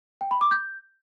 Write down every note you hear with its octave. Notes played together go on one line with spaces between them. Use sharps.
G5
B5
D6
G6